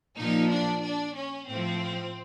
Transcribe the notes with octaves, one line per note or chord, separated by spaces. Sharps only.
A#2 F3 D#4
D4
D4
C#4
A2 F3 C4